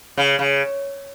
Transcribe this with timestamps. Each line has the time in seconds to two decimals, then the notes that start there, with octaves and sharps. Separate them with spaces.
0.17 C#3
0.39 C#3